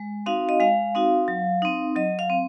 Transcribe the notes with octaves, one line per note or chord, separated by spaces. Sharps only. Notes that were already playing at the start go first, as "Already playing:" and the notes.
Already playing: G#3
C4 D#4 F#4 F5
D#5
G#3 F5
C4 D#4 F#4
F#3
C4 D#4
F#3 D#5
F5
C4